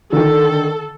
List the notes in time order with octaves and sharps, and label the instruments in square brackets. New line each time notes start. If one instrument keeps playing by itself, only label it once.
[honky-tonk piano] D3 D#3 [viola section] A4